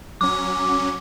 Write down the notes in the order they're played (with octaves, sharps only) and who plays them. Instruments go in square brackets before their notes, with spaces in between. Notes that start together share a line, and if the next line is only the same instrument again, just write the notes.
[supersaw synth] F#3 C#4 [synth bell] D6